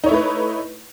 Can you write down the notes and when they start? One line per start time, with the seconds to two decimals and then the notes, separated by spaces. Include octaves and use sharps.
0.04 D#4
0.06 C#5
0.09 E4
0.11 A3
0.14 B4